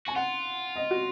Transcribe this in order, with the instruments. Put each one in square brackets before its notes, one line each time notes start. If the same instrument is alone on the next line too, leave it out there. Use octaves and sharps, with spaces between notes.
[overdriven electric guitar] F#4 [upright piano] G#5
[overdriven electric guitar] F4 [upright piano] F#5
[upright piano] D#5
F#4